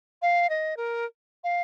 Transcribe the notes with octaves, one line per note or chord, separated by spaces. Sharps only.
F5
D#5
A#4
F5